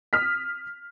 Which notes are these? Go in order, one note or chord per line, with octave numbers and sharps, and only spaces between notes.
D#6 F6 B6